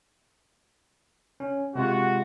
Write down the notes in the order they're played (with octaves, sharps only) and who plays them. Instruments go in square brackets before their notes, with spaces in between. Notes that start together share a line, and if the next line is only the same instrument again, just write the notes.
[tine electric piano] C#4
[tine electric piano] C3 G#3 F4 [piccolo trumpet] F#4